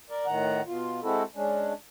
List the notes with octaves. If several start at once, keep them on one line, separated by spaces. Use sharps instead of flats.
A#4 D5
A2 D#3 F#5 A#5
B2 F4
G#3 C4 E4 F#4 A4
G#3 C#4 D4